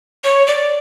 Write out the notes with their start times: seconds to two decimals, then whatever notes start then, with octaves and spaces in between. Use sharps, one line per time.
0.24 C#5
0.47 D5